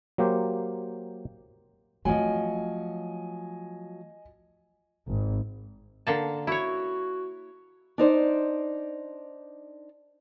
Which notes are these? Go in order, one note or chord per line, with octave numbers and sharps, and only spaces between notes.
F#3 A#3 G4 C5
F3 F#3 A3 C4 D#5 G#5
G#1
D3 A#3 A5
E4 F#4 C#5
D4 D#4 C5 D5